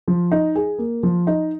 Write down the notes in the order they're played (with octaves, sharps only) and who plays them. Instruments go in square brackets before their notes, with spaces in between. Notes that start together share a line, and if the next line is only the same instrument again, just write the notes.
[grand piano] F3
D#4
G#4
A#3
F3
D#4